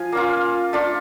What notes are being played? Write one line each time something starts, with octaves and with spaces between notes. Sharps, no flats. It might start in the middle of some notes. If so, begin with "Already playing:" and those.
Already playing: F3 F5 G#5
A#3 C#4 F4
A3 D4 F4